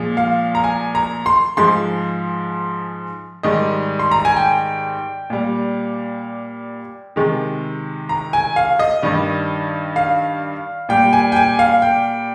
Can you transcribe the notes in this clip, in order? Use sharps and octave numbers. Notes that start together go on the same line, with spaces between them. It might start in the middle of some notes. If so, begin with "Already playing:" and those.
Already playing: A#2 F3 G#3
F5
A#5
G#5
A#5
C6
G#2 F3 G#3 C6
G#2 D#3 G3 D#5
C6
A#5
G#5
G5
A#2 G3
C3 D#3 G#3
A#5
G#5
F5
D#5
G2 D#3 G3
F5
A#2 G3 G5
G#5
G5
G#5
F5
G5